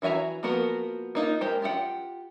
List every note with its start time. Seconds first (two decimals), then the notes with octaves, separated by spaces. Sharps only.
0.02 E3 F#4 E5 G#5 A#5
0.43 F3 A#3 B3 F#4 A#4
1.15 A#3 D#4 F4
1.41 G#3 G4 A#4 C5
1.62 F4 G4 C5 F#5 G5